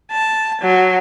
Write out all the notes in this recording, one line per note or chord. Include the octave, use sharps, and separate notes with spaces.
A5
F#3